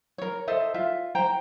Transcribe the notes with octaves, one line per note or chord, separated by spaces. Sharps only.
A#4 C#5
A4 C5 D#5 E5
F4 E5
C5 G5 A#5